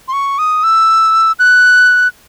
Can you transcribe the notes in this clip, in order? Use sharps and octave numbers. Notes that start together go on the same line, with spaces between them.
C6
C#6
D#6
E6
F#6